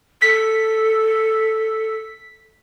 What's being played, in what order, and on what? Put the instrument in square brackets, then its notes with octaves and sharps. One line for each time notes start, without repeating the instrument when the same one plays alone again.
[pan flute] A4 [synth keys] B6